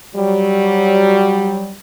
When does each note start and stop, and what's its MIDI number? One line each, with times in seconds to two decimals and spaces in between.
0.15 1.73 54
0.15 1.73 55